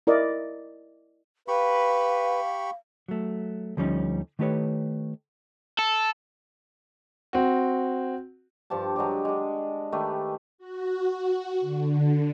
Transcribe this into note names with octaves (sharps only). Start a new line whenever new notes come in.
E4 A#4 D5 D#5
G4 B4 F5 B5 C#6
F#3 A3
D2 F3 G3 C#4 D#4
D#3 A3 E4 G4 B4 C#5
A4
C4 F#4
G2 F3 G4 A5
F#3 G#3 D4 G4
G#3 D4
D#3 A3 G4 B4
F#4
D3